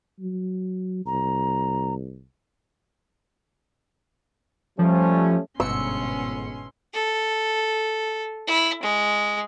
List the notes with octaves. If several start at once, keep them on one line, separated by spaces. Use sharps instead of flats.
F#3
C2 A#5
F3 G3 A3 C#4
G1 G#2 B2 B3 C#4 C6 E6 C#7
A4
E4
G#3